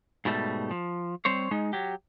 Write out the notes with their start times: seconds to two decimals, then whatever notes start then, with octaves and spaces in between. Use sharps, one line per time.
0.25 G#2 B2 G3 A3
0.71 F3
1.25 G3 C4 C5 C#5
1.51 G#3 D#4
1.73 F#3 G4